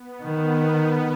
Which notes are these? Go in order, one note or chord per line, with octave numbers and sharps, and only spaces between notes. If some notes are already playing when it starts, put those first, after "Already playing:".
Already playing: B3
D#3